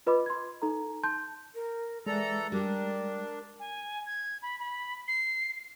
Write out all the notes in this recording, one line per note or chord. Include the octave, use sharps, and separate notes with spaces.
F4 B4 D#5 B5 D6
C6 G#6
D#4 A4 A#5
A5 C6 G6
A#4
E3 G#3 A4 D5 A#5
G3 D4 G4 A#4
G#5
G#6
B5
B5
C7